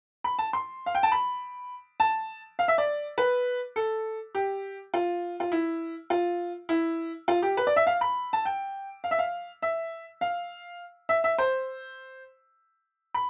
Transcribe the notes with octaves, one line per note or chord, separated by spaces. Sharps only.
B5
A5
C6
F5
G5
A5
B5
A5
F5
E5
D5
B4
A4
G4
F4
F4
E4
F4
E4
F4
G4
B4
D5
E5
F5
B5
A5
G5
F5
E5
F5
E5
F5
E5
E5
C5
B5